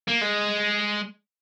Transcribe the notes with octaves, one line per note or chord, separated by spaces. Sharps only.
A#3
G#3